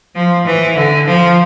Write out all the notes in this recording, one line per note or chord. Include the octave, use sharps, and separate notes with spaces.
F3
E3
D3
F3